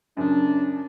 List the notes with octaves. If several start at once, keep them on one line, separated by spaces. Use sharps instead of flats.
F#2 C#3 D4